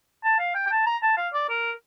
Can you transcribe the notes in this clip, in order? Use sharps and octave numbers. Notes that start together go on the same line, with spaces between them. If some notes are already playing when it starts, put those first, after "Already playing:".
A5
F5
G5
G5
A5
A#5
A5
F5
D5
A#4